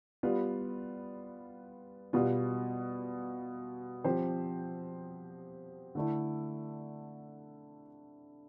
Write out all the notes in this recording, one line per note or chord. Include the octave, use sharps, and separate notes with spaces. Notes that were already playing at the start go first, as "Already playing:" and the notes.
G3 B3 F4 B4
B2 G3 B3 F4
F3 C4 G4 C5
D3 A3 E4